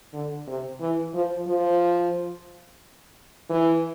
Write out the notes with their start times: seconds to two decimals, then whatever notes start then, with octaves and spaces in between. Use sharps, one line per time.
0.13 D3
0.47 C3
0.81 E3
1.14 F3
1.48 F3
3.50 E3